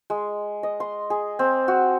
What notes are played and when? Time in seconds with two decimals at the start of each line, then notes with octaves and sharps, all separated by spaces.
0.10 G#3
0.63 D#5
0.80 C6
1.10 G#4
1.39 C4
1.68 F#4